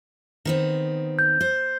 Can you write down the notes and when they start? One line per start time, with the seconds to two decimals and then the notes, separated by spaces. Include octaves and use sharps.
0.45 D#3 B3 C4
1.19 G6
1.41 C5